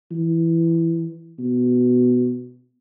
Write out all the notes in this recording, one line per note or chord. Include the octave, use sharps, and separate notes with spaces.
E3
B2